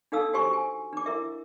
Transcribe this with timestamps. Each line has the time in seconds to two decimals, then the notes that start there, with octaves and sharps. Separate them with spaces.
0.12 D4 D#4 A4 F5 D#6 E6
0.33 F#4 G4 C5 G#5 C6 C#6
0.53 G#5
0.93 D4 D6
1.06 E4 A#4 E5